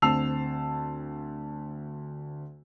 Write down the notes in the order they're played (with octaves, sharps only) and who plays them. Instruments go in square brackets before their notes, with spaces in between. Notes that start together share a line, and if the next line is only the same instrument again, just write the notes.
[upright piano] D2 C4 A5 E6 C7 F7